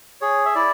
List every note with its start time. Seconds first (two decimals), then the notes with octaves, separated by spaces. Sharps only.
0.21 G#4 C#5
0.45 E5
0.55 E4 D5